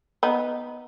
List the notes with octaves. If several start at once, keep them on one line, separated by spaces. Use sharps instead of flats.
B3 D#4